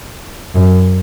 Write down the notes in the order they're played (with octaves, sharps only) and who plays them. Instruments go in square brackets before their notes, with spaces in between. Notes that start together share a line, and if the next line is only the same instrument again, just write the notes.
[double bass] F#2